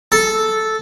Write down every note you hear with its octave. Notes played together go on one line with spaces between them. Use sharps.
A4